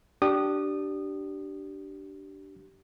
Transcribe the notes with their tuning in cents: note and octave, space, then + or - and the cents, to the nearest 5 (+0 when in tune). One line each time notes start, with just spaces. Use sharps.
D4 +0 G4 -25 D#6 -20